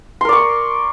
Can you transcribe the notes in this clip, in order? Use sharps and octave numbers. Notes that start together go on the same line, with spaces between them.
A#4 D5 C6 C#6